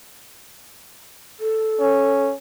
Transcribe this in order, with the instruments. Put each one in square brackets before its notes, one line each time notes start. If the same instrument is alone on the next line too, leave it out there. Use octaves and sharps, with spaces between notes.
[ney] A4
[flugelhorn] C#4